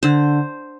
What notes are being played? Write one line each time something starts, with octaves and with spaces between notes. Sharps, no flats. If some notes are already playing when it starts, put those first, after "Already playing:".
D3 C5